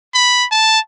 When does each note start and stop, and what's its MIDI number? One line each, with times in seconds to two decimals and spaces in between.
0.14 0.46 83
0.52 0.79 81